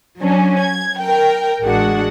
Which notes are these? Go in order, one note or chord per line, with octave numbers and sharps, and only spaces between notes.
F#3 C#4 D4
G#6
A#4 G5
A1 G#3 D4 F#4 F#5